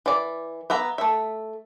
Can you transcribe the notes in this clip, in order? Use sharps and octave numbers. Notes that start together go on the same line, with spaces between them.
E3 D5
B3 E5 A#5
A3 E5